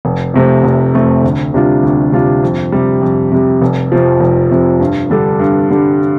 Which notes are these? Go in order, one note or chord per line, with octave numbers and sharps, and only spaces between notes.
F1
F2 C3 A3 C4
F1
F2 C3 A3 C4
D2
C3 G3 D4 F4
D2
C3 G3 D4 F4
F2
C3 G3
F2
C3 G3
F1
F2 C3 F3
F1
F2 C3 F3
G2
D3 G3 D4 A4
G2
D3 G3 D4 A4